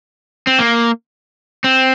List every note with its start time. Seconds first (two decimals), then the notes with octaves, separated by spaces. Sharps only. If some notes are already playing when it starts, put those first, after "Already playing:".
0.47 C4
0.59 A#3
1.64 C4